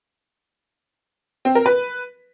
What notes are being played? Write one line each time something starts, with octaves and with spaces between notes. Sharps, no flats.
C4
A#4
B4